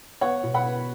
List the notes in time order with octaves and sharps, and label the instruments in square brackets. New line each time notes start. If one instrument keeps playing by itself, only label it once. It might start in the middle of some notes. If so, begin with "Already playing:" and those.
[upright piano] B3 C#5 F#5
B2
F#5 B5
B3